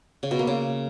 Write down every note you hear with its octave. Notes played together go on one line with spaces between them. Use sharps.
C#3
B2
A#3
C#3